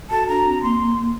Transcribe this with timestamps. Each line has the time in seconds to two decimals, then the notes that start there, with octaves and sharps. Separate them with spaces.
0.10 F#4 A4 A5
0.28 D4 F#4 A#5
0.46 C4
0.62 A#3 C6